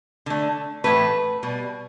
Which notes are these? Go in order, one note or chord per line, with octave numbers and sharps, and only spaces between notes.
D3 A3
A2 E3 A3 B4
B2 G3